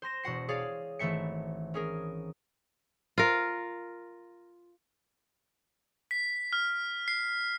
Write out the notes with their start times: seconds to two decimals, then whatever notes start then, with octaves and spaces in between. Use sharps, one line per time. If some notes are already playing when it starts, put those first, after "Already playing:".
0.02 C5 C6 A#6 E7
0.24 E1 F#4 F#5 C7
0.48 G#4 C#5 D5 F5
0.99 G#1 E3 A3 E5 C#7
1.74 C#4 G#4 A#4
3.18 F4 A#4
6.11 B6
6.53 F6
7.08 C7